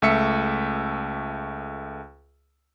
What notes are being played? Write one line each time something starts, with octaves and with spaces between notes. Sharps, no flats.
C#2 A3 E5 C#7